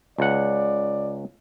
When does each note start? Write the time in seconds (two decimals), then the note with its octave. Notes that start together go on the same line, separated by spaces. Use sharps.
0.18 C#2 D5 F#5